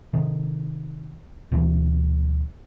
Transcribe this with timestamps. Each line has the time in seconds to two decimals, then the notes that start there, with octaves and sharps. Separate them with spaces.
0.13 C3 D#3
1.52 D2 B2 E3 F#3